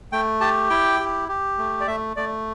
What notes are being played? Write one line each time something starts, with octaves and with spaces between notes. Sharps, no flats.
A3 G5
G4 A5
E4 G5
G4
G4
A3
D5
A3 E5
A3 D5